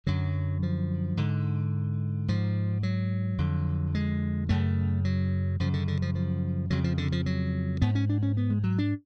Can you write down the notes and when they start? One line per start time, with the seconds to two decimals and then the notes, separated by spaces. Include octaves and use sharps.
0.06 F#2 D3 F#3
0.63 F3
1.17 G#2 D3
2.28 G#2 F3
2.83 F#3
3.38 F2 D3
3.95 G#3
4.49 F#2 C#3 A3
5.05 F#3
5.60 F#2 C#3 F3
5.73 D3
5.88 D3
6.02 F3
6.15 F3
6.70 F2 C#3 F#3
6.84 F3
6.98 D3
7.12 F3
7.26 F#3
7.82 G#2 B3
7.95 C#4
8.10 D4
8.23 C#4
8.37 B3
8.50 G#3
8.64 F#3
8.78 D4